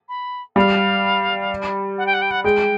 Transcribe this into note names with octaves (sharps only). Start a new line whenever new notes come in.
B5
G3 F5
F#5
G5
F#5
G5
F#5
G#3 G5